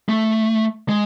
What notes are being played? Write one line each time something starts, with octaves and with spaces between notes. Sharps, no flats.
A3
G#3